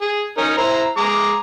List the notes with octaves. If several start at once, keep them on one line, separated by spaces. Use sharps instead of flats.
G#4
C#4 D#4 A#4
E4 C5 A#5
G#3 A#5 D6